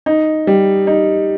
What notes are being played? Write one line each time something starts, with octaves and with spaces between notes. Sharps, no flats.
D#4
G3
D#4